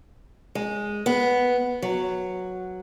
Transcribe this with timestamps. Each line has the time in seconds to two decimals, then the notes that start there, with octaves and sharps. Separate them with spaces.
0.55 G#3
1.06 B3
1.82 F#3